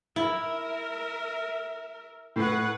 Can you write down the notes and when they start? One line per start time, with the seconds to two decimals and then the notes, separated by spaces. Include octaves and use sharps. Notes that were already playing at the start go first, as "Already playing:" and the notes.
0.16 E4 A#4 E5
2.36 A2 B4 F#5